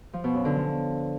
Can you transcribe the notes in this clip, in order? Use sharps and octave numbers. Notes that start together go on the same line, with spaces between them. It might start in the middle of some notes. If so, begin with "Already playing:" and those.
F3
B2
F#2
D3
F3